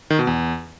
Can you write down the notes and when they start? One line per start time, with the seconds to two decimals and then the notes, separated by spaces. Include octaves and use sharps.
0.10 D#3
0.19 B2
0.27 E2